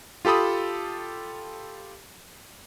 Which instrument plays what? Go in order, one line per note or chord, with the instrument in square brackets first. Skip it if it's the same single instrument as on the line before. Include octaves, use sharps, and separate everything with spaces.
[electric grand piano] F4 G4 A4 B5 D#6